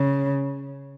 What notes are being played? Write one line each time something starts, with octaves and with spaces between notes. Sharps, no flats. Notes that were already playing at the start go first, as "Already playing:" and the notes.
Already playing: C#3